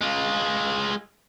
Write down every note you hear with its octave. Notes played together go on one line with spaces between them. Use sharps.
G#3 F4